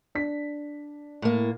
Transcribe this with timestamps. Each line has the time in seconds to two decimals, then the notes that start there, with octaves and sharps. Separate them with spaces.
0.15 D4 B6
1.22 A2 A#3